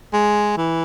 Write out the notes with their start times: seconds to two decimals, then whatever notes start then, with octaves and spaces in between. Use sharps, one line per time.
0.13 G#3
0.57 E3